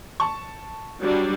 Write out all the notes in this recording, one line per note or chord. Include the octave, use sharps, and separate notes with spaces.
A5 C#6
F#3 G3 D4